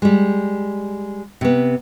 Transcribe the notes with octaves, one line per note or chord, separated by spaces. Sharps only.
G3 G#3
C3 B3